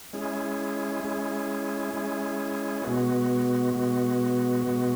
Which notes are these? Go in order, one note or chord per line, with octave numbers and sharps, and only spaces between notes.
G#3 C#4 E4 G#4
G#3 C#4 E4 G#4
G#3 C#4 E4 G#4
B2 G#3 B3 F#4
B2 G#3 B3 F#4
B2 G#3 B3 F#4